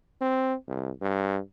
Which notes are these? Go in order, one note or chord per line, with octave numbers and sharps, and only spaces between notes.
C4
C2
G2